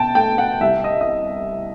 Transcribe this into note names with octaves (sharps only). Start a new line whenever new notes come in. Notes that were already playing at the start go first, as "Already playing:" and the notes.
Already playing: B2 G5 A5
A3 G5
F#5
C2 E5
D#5
D#5